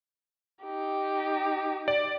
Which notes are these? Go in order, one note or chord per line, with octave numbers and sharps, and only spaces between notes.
D#4 G4
D5